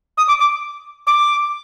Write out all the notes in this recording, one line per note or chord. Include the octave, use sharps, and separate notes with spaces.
D#6
D6
D6
D6